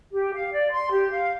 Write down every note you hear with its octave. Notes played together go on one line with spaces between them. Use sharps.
G4
F5
D5
C6
G4
F5